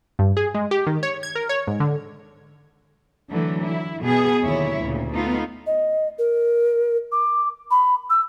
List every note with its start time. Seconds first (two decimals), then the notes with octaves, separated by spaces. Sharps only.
0.19 G2
0.37 G#4
0.54 G#3
0.71 G4
0.87 D#3
1.03 C#5
1.23 G#6
1.35 A#4
1.49 C#5
1.67 G#2
1.80 D3
3.31 D3 E3 F#3 A3
3.67 E4
4.04 B2 B3 G#4
4.43 D#2 D3 F#3 E4 C#5 E5
4.81 D2 A#2 C#3
5.13 A3 B3 D#4 F4 F5
5.67 D#5
6.19 A#4
7.12 D6
7.71 B5
8.10 E6